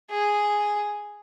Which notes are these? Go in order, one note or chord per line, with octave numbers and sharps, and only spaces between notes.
G#4